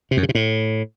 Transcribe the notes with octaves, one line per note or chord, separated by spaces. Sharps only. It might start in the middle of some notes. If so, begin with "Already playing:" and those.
C3
F#2
C#3
C3
A2